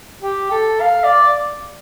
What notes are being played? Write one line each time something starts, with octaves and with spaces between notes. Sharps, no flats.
G4
A4
F5
D5